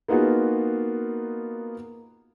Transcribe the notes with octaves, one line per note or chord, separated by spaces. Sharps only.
A#3 B3 D#4 F4 F#4 G#4